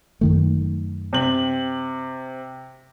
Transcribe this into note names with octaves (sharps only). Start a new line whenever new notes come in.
F#2 D#3 A3
C3 F#7